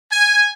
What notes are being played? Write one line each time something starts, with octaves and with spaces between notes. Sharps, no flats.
G#5